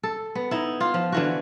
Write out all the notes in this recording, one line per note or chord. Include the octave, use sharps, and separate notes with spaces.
A4
B3
D#4 E4
F4
F3
D3 E3 F#4